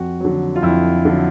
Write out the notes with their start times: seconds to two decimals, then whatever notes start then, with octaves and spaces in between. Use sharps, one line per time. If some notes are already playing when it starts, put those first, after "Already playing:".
Already playing: F2 F#4
0.20 D3 F#3
0.56 F4
0.62 F2 E4
1.05 D3 F#3